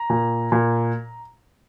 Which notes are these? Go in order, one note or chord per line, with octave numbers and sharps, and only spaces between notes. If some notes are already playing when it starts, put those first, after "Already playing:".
Already playing: A#5
A#2
A#2